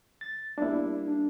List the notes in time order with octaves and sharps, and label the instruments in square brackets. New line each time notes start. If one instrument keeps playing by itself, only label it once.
[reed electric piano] A6
[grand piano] G3 A#3 [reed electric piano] D4 E4
[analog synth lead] D4